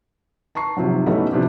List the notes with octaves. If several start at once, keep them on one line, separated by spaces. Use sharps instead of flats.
A5 A#5 C#6 C7
C3 D#3 F3 F#3
E3 G3 A3 B3 C#4 D#4
C3 F3 D4 E4 G4